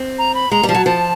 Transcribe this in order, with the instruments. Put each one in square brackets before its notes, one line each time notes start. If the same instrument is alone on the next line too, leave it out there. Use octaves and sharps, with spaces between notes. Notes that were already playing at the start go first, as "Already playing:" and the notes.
Already playing: [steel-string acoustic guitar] C4
[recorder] A#5
B5
[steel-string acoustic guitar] G#3 [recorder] A#5
[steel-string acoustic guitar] G3
[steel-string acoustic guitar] F3 [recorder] A5
[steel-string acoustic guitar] F#3
[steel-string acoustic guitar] F3 [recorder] A5